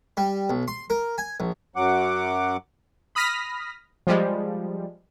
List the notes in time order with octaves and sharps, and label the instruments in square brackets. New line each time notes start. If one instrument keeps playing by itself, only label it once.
[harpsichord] G3
B1
C6
A#4
G#5
A#1
[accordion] F#2 F#3 F#5 D6
[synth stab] B5 D#6 F6 A#6 B6
F3 G3 G#3